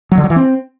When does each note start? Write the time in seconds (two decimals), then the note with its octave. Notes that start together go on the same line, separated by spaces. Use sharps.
0.12 F#3
0.18 D3
0.24 F#3
0.30 E3
0.36 C4